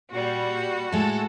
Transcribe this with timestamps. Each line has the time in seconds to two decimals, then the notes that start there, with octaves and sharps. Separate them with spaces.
0.12 A#2 G3 F#4
0.92 A2 G#3 A4